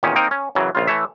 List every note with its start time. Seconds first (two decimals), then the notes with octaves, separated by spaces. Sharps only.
0.03 E2 A#2 D#3 C#4
0.16 A#3 C4 D#4 A#4 G5
0.31 C#4
0.55 F#2 C#3 E3 F#3
0.75 A#1 C#3 F4
0.87 E3 A3 C#5 E5